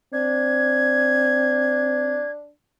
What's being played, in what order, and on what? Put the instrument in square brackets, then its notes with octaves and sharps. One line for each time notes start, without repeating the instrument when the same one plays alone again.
[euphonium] C4 [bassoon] D4 [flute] G#6